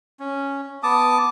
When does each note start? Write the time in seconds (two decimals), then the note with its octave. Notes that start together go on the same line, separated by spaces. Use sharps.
0.20 C#4
0.83 B3 A5 D6 D#6